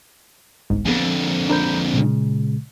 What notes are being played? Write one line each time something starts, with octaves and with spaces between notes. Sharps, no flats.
G1 C2 G#2
F2 D3 B3 G#4 G#5
D4 A#4 C5 A#5 B5 G6
A#2 C#3 G#3